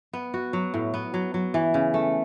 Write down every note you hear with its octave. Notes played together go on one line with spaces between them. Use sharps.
B3
F#4
F#3
A2
B3
F#3
F#3
E3
C#3
A3